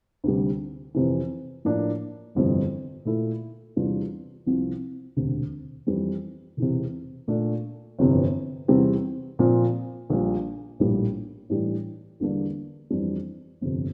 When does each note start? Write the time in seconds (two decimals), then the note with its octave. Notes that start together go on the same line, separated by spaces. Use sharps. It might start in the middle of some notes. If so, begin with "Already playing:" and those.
0.24 D2 C3 G3
0.94 F2 C3 E3
1.65 A2 F3 A#3 D4
2.35 G1 F2 C3 E3 G3
3.05 A#2 A3 E4 A4
3.76 E2 C3 G3 D4 F4
4.46 C2 C3 F3 C4
5.17 E1 D2 C3
5.87 F2 E3 G3
6.57 E1 E2 C3
7.28 A#2 A3 D4 A4
7.99 G1 F2 C3 E3
8.68 E2 C3 G3 C4 G4
9.39 A#2 F3 C4
10.10 A#1 A#2 G3
10.79 A#1 A2 G3 A#3
11.50 A2 E3 G3 D4 G4
12.20 E2 D3 G3 A#3 D4
12.90 F2 E3 G3 D4
13.61 G1 F2 C3